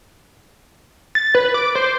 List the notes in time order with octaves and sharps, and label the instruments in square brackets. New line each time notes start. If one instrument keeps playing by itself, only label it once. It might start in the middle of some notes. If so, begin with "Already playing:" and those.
[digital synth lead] A6
B4
D6
C5